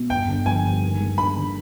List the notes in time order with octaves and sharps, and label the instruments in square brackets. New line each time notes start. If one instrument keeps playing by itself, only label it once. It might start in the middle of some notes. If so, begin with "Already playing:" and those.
Already playing: [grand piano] B2
[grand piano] G1 [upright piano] G5
[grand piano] D3
[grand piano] F3 [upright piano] G#5
[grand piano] G2
D#2
G#3
[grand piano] D4 [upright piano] B5
[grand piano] D3